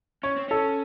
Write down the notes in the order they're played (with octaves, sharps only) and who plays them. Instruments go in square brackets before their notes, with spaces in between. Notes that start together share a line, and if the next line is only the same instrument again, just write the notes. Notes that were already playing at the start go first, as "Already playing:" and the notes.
[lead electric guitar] C#4 [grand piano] C#5
[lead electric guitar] C4
[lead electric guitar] C#4 [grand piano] A4